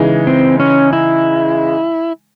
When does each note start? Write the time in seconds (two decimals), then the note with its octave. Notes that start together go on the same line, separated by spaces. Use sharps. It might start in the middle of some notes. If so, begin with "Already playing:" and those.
Already playing: C#3 E3 G#3 D#4
0.27 C4
0.60 C#4
0.93 E4